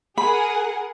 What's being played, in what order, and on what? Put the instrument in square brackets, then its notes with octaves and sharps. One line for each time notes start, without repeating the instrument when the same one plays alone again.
[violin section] G#4 A#4 F#5 [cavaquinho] B5